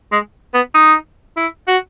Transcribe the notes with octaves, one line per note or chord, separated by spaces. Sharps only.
G#3
B3
D#4
E4
F#4